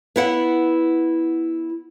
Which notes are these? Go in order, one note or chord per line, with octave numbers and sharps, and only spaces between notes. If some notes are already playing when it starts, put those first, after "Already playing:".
B3 E4 F#5